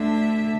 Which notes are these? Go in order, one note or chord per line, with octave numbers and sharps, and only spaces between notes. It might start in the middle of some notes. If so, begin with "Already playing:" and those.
Already playing: D2 D3 A3 D4 E5